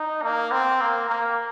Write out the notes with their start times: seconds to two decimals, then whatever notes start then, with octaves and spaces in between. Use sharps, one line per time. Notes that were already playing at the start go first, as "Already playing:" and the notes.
Already playing: D#4
0.23 A#3
0.52 C4
0.81 A#3
1.09 A#3